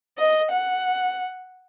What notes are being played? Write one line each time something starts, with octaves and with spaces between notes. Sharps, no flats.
D#5
F#5